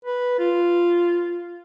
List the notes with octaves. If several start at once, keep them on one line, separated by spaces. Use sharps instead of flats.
B4
F4